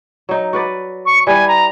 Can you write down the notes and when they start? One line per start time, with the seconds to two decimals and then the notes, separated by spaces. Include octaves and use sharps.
0.29 F#3 D#4
0.53 F#4 B4 D5
1.06 C#6
1.27 G3 E4 B4 G#5
1.48 A#5